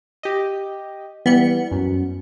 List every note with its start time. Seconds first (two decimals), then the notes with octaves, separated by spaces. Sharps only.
0.23 G4 D#5
1.26 E3 G3 B3 C#7
1.72 F#2